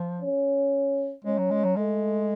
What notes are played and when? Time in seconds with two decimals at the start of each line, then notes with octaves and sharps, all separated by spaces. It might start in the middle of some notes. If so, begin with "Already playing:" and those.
Already playing: F3
0.21 C#4
1.24 G#3 C#4
1.38 F#3
1.51 G#3
1.64 F#3
1.77 G#3 A3